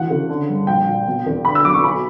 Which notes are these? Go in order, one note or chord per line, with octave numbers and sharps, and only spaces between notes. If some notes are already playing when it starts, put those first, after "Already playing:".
Already playing: D2 E3 F#5
C#3
D3
G2
A#1 G5
A#2
B2
E2
D3 B5
E6
F#2 D6
C#6
B1 B5